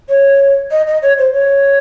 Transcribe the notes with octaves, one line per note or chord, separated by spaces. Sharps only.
C#5
D#5
D#5
C#5
C5
C#5